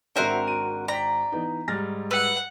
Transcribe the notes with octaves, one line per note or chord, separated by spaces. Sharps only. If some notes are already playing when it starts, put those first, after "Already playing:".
G#1 C4 D4 F#4 A#4 C5 E5 F#5
D7 D#7
D5 G5 A#5 B6
E3 B3 D#4
G#2 G3 F6 A6 A#6
B4 F#5 E6